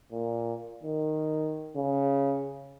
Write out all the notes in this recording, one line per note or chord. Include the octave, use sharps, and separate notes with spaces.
A#2
D#3
C#3